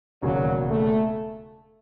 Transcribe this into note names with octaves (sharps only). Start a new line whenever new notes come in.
E1 D#2 C#3 F#3
A3